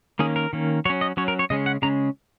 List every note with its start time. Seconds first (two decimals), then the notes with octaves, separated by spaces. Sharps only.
0.19 D#3 A#3 C#4 G#4
0.36 A#4
0.53 D#3 A#3 C#4
0.85 F#3 C#5
0.90 C#4
1.01 D#5
1.17 F#3 C#4 C#5
1.28 A#4
1.39 C#5
1.50 C#3 G#3 C#4 D#5
1.66 F#5
1.82 C#3 G#3 C#4 A#5